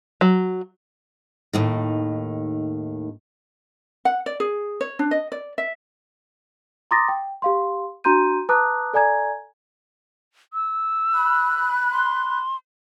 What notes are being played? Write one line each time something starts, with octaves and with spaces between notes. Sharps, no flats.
F#3
D#2 A2 D#3
F#5
D5
G#4
C#5
D4
D#5
D5
E5
A#5 C6 D6 D#6 A6 A#6
G5
G4 F5 C6
D4 F#4 A#5 C6 G6 D#7
B4 A5 A#5 D6 D#6 F#6
A4 D5 G#5 A#5 G#6
E6
B5 F#6
C6